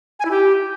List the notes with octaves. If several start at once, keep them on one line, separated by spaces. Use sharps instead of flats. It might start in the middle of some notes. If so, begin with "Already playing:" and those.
G#5
E4
G4